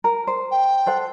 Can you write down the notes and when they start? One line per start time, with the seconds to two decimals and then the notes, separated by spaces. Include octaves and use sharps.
0.04 A#4
0.27 C5
0.51 G5
0.86 A4 C5 F#5